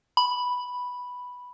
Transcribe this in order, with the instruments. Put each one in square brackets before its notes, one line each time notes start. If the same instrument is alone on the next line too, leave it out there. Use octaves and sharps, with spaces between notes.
[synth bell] B5